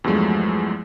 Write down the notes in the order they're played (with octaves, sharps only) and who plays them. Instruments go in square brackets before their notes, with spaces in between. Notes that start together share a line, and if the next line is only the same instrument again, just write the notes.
[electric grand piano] E2 G2 F3 F#3 G#3 A3